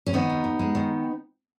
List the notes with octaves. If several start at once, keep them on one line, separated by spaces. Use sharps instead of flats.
C#4
D#3 B3 D#4
D#2
D#2
G#3
D#3